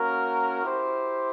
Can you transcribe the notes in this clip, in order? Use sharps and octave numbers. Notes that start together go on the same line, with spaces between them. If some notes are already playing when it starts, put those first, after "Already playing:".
Already playing: A#3 C#4 F#4 A#4
E4 G4 C5